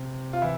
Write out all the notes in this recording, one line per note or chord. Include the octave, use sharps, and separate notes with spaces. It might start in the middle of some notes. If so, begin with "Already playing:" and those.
Already playing: C3
F4
E3 E4